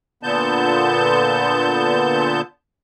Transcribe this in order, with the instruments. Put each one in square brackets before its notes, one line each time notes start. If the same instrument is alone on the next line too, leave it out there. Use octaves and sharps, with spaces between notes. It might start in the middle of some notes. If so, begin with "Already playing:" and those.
[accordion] A#2 D3 B3 A5 G6